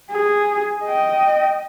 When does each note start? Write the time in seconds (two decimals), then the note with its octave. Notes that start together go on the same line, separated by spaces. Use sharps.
0.12 G#4
0.85 D#5 G5